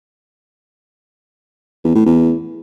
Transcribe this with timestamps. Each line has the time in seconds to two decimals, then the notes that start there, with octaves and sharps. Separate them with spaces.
1.84 E2
1.95 A2
2.06 E2